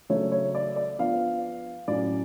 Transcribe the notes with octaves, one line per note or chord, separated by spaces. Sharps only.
C#3 F#3 A3 D4 C#5
C#5
D5
D5
F3 B3 D4 F5
A2 F#3 C#4 D5